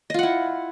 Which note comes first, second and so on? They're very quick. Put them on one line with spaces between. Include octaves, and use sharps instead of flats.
D#5 F4 F#5 E4